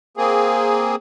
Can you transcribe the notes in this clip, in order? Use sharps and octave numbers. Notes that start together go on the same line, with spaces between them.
A#3 C4 G#4